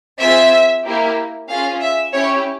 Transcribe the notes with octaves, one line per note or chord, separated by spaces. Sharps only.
C4 F4 G#4 E5
A#3 E4 G4
C#4 F4 G#4 F5
E5
C#4 E4 G4 C#5